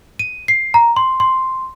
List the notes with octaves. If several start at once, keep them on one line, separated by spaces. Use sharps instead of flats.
D#7
C7
A#5
C6
C6